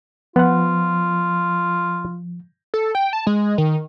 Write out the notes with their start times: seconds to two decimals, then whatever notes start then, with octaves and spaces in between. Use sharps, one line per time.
0.36 F3 B3 F4 F#5
2.74 A4
2.95 G5
3.13 A5
3.27 G#3
3.58 D#3